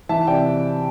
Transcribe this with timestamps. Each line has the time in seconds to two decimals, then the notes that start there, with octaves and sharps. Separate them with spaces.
0.09 E3 E5 A5
0.27 C3 D5 G5